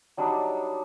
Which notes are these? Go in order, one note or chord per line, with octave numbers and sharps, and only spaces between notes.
F#3 G3 D4 D#4